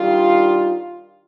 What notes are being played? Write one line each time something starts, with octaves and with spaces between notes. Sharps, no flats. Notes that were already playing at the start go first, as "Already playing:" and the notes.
Already playing: D#3 G3 D4 F4